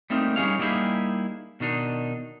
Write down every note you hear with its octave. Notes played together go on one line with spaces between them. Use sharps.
G3 A3 A#3 C4 D#4
G3 C#4 D#4 G#4 C#5 F5
G3 A#3 D#4 E4 G4 G#4
B2 D#3 D4 D#4